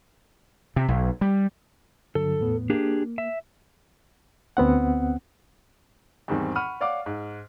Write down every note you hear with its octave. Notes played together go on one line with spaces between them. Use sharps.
C3
B1
G3
G2 D3 F#3 A4
E2 A2 B3
A#3 D4 G4 G#4
E5
D2 B3 C4 F#5
E2 G#2 D#3 G3 C4
F#5 B5 C#6 F6 D#7
C#5 D5 F5 F#5 D6
G#2